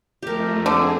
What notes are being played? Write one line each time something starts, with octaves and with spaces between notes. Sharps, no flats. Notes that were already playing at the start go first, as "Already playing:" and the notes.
F2 A3 G4 A#4
D3 C4 G#4